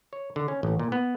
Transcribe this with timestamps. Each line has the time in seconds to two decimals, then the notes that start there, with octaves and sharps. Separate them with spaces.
0.13 C#5
0.36 D3
0.48 C#4
0.63 A1
0.79 A#2
0.92 B3